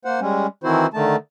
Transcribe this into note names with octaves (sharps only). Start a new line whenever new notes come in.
A#3 C5 F#5
G3 G#3 C#4
D#3 E3 C4 E4 F#4 C5
D3 D#3 A3 A5